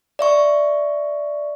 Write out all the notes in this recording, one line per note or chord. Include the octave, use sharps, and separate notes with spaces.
D5 E5 C#6